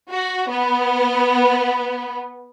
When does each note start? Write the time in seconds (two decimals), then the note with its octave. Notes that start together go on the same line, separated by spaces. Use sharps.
0.11 F#4
0.50 B3